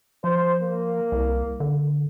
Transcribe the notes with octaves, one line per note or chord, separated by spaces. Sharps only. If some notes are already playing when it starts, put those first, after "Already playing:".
F3 C5
A#3
C2
D3